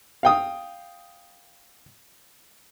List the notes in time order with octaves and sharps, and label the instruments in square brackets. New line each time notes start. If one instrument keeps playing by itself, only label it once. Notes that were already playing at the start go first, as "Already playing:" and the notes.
[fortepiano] F5 G5 D#6